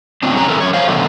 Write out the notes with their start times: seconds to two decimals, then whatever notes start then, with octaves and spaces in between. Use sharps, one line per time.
0.23 A2 F#3 C4 D4
0.35 F2 C3 C#4 G#4 A#5
0.48 E3 A4 A#4
0.60 F#2 C#5
0.73 C5 C#5 F5
0.88 B2 D3 D#3 F#3 A3